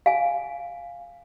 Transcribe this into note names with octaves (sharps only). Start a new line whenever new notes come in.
F5 G#5